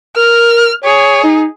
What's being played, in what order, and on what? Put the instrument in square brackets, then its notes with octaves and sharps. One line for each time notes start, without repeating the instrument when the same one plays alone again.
[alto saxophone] A#4 [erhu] F6
[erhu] G#4 [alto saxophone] C#5
[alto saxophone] D#4